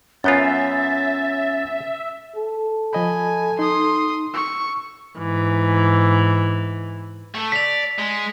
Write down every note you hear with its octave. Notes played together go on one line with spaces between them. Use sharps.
F#2 B3 C#4 F4 E5 G6 A6
A4
F3 D#5 G#5 B5
D#4 C6 D#6
C#6 E6
G#2 E3
A3
D5 B6 F7
G#3